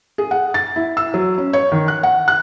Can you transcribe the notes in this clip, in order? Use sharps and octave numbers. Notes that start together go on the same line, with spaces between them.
G#4
F#5
A6
E4
E6
F#3
C#4
C#5
D#3
F#6
F#5
F#6